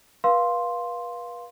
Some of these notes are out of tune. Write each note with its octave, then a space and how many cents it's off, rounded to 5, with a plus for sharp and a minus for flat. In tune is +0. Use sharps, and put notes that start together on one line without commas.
B4 -35 F5 +5 C6 +0